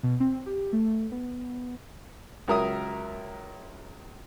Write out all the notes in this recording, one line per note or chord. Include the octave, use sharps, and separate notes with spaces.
B2
C4
G4
A3
B3
C#2 F#3 A#4 E5 D#6